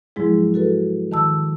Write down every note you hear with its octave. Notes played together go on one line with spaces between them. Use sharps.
G#2 F3 F#3 G#3 E4 G#4
F#4 A4 B4
D#3 A5 E6